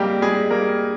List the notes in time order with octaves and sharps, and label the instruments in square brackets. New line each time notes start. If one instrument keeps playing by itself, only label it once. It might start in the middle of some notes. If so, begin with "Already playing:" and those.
Already playing: [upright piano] G#2 G3 A#3 C4 G4
G3 G#3 G#4
G3 A#3 A#4